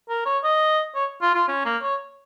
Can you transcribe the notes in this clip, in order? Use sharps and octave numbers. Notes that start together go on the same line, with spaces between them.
A#4
C#5
D#5
C#5
F4
F4
C#4
A#3
C#5